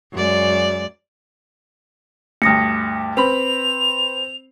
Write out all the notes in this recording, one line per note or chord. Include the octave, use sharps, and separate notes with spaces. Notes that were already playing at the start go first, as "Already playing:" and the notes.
F#2 G#3 D5
D2 G2 D#6 A#6 C#7
C4 B4 B5 F7